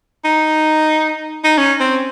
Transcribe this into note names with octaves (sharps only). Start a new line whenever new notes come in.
D#4
D#4
C#4
C4